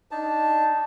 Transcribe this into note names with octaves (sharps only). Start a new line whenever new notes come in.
D4 D#4 A5